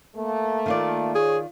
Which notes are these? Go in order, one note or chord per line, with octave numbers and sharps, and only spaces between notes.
A3 A#3
D#3 F4 D5
G#4 C#5